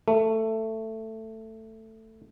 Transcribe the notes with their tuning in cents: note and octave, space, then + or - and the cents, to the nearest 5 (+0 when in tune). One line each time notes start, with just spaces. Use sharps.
A3 +10